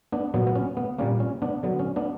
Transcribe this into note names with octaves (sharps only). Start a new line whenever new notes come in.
B3 D4
A#2 F#3 B3
B3
C#4
B3
A#2 G3 A#3 C#4
C#4
B3 D4
D3 F#3 B3
C#4
B3 D4